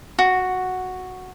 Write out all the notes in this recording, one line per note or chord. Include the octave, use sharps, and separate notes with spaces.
F#4